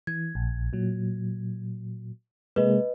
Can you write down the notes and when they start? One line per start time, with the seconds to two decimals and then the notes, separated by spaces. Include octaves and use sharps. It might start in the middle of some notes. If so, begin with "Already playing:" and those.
0.07 E3 G#6
0.35 A#1
0.73 A#2 F#3
2.56 C3 G#3 A#3 B4 D#5